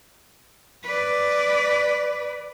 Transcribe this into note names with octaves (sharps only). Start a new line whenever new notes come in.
B4 D5